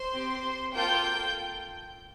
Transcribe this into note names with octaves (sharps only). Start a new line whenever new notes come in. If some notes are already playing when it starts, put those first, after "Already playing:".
Already playing: C5 C6
C4 G4
A#3 F4 A4 G5 G6